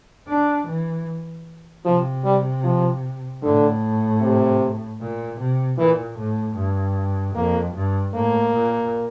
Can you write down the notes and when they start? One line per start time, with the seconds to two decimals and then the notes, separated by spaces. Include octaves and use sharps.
0.28 D4
0.68 E3
1.85 C3 F3
2.24 G3
2.64 F3
3.43 A2 D3
4.21 C3
5.00 A#2
5.39 C3
5.78 A#2 E3
6.18 A2
6.56 G2
7.35 F2 A#3
7.74 G2
8.14 A2 A#3
8.53 A#2